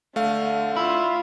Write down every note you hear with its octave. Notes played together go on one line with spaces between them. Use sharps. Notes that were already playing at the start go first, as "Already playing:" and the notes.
D3 A3 F5
E4 F4